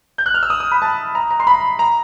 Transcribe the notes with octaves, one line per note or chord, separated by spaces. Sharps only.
G6
F#6
F6
E6
D#6
D#6
B5
A5
A#5
A#5
C6
B5
A#5